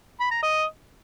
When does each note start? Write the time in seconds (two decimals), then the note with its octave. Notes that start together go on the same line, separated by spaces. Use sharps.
0.20 B5
0.31 A#5
0.43 D#5